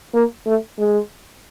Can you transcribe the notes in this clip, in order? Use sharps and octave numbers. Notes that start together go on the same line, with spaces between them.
A#3
A3
G#3